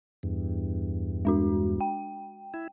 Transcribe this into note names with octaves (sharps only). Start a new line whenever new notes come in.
E2 G2
G#3 D4 F#4
G5
E4